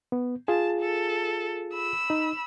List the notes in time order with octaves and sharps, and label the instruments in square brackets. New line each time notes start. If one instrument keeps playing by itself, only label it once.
[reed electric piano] B3
[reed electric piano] F4 G#4 [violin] A5
[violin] A4
B5 E6
[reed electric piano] D#4